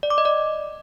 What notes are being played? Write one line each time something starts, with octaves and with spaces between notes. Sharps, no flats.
D5
D6
D#5
D5